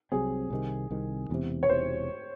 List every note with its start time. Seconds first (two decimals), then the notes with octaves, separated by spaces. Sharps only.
0.12 C2 C3 F#3 C4 G#4
0.50 C2 C3 D#3
0.91 C2 C3 D#3
1.30 E1 E2 C3
1.63 C#5
1.69 E1 E2 C3 C5